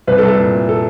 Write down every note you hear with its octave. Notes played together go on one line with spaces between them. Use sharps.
C2 B4
A4
C2
A4
A#2
A#2
A4